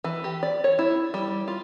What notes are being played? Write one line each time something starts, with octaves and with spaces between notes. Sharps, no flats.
E3
G4
D5
C#5
E4
G3
F4